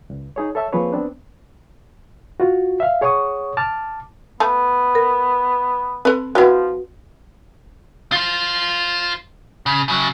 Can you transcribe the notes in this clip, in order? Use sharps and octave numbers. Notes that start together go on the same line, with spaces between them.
C#2
D#4 G#4 C#5
A4 C#5 E5 A5 E6
F3 A#3 C4 G#4 B4 C#5
B3 C4 D4
F4 F#4
E5 F5
G#4 C#5 F#5 C#6 D#6
A5 D6 F6
A3 B3 A5
A#4
C4 A4 B4
F3 E4 F#4 B4 F#5 G5
F4 C5
C#3
C#3 F#3